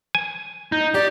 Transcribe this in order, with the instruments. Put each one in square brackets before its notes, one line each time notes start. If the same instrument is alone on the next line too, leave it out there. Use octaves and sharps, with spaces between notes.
[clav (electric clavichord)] G#5
[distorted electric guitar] D#4 [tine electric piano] G6
[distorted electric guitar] G4 [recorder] D5